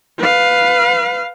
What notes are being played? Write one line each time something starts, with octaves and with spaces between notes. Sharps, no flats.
B4 F5